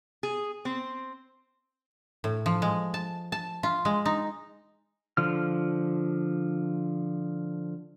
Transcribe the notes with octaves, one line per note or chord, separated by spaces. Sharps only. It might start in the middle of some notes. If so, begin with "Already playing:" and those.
G#4
C4
A2
F3
G#3
A5
A5
F4
G#3
D#4
D3 F3 F6